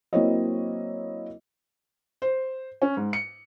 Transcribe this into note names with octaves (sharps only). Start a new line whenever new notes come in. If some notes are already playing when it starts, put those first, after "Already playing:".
F#3 A#3 C4 E4 C#5 D#5
C5
C#4
G#2
C#7